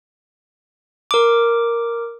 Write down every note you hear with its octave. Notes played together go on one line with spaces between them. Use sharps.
A#4 D6